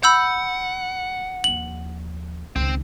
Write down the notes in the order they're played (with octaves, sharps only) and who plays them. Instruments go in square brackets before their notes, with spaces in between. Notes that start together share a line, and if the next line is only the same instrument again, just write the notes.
[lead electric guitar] F#5 [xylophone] B5 E6 G6
[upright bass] D#2 F3 [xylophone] F#7
[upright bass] C#2 D#3 [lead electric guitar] C4